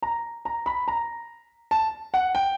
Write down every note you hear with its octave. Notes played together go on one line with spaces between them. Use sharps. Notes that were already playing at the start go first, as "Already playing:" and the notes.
A#5
A#5
B5
A#5
A5
F#5
G5